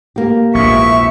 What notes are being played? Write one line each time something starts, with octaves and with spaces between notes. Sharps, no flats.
A#3 G4
A#1 E2 G#2 E5 C#6